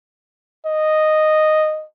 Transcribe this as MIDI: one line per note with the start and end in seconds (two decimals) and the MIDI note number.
0.66 1.84 75